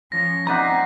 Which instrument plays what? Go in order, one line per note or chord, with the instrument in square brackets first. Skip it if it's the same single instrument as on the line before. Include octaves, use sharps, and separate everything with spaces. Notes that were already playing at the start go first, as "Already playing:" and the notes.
[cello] F3 C#4 [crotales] A#6
[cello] F3 C4 [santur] D#4 D5 F#5 [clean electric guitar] E5 G#5 A#5